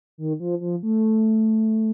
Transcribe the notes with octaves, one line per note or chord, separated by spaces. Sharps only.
D#3
F3
F3
A3